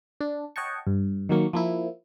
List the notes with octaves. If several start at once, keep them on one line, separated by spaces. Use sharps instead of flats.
D4
C#5 D#5 F#5 G5 A5 C#6
G2
D#3 F#3 A#3 C#6
F3 A#3 E4